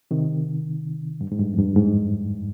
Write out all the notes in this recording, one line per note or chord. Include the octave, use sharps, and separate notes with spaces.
C3 D#3
G2
G#2
G2
F2
G2
G#2